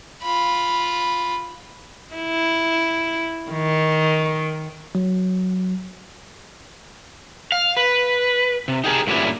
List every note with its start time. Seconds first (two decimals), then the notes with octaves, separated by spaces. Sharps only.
0.23 F4 B5
2.15 E4
3.51 D#3
4.95 F#3
7.52 F5
7.77 B4
8.68 C3
8.84 D#4 G4 G#4 A#4
9.07 G2 A#2 D3 G3 C#4 E4